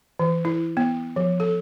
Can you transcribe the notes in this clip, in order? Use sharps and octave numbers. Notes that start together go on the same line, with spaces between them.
E3
E4
B3
F3
A4